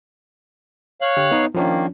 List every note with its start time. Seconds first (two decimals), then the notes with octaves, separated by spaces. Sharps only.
1.01 C#5 F5 F#6
1.17 D3 G4 G5
1.31 B3 D#4
1.55 D#3 F3 A#3 C#4 D4